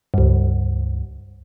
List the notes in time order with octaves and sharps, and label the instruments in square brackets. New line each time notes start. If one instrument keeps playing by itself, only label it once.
[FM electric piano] C#2 G2